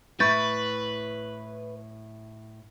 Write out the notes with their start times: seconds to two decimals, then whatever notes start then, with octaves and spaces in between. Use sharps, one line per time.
0.20 A2 E4 B4 C#6 G6 A6